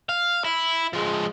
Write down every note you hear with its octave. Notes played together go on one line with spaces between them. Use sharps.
F5
E4
F3 G#3